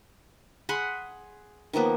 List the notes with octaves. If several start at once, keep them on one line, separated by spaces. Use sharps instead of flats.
G#4 F#5 B5 C6
D#3 F3 A#3 B3